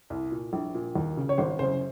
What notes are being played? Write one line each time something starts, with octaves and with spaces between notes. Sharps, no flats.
C2
A#2
A#1
A#2
D#2
C#3
C#5
G#1 C5
F#2 C#3 C5